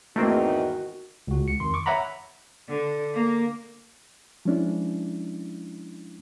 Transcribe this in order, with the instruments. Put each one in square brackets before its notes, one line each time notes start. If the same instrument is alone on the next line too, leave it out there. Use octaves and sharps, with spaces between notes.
[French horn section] E2 G#2 D#3 [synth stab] A3 A#3 C4 [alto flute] F#4
[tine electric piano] C#2 F#4
C#7
F2 D#3 C6
C#6 D6
C#5 E5 F#5 A#5 B5
[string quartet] D3
A#3
[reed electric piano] F3 G#3 C#4 D4 E4